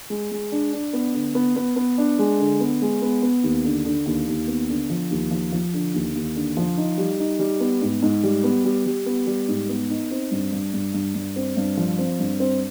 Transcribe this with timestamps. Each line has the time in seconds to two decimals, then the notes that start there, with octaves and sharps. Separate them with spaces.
0.10 G#3
0.31 G#3
0.52 D4
0.73 D4
0.93 B3
1.14 D3
1.35 B3
1.56 B3
1.76 B3
1.98 D4
2.19 G#3
2.39 D3
2.60 B3
2.82 G#3
3.02 B3
3.22 B3
3.43 D#2
3.65 D3
3.85 D3
4.06 D#2
4.27 D#2
4.48 B3
4.69 D3
4.90 F3
5.11 D#2
5.31 F3
5.52 F3
5.73 D3
5.94 D#2
6.15 D#2
6.36 D3
6.57 F3
6.77 D#4
6.98 G3
7.19 D#4
7.39 G3
7.60 B3
7.81 G#2
8.02 G#2
8.23 G3
8.44 B3
8.65 G3
8.86 G3
9.06 B3
9.27 G3
9.48 G#2
9.69 B3
9.90 D#4
10.11 C4
10.31 G2
10.52 G2
10.74 G2
10.94 G2
11.15 G2
11.36 C4
11.57 G2
11.77 F3
11.98 C4
12.19 G2
12.40 C4